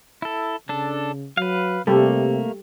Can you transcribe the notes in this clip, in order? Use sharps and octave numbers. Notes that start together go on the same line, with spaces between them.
E4 A4
C#3 D4 A4
F#3 B4 F5
C3 G3 A3 A#3 G4 A4